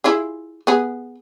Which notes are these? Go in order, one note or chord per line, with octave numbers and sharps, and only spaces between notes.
E4 F4 G#4
B3 G#4